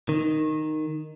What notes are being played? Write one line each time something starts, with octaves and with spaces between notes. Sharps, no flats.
D#3